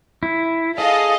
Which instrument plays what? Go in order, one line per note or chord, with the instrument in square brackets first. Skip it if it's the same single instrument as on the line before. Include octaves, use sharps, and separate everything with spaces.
[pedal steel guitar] E4
[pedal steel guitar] G#4 [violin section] A4 D#5 F5